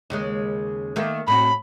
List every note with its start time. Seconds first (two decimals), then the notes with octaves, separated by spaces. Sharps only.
0.10 D#2 C#3 G#3
0.96 D#3 A3 A#3
1.28 A2 C4 F#4 B5